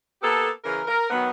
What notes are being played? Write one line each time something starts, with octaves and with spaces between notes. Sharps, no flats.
A#3 B3 G4 A4
C#3 E3 A#4
A#4
D#3 F#3 B3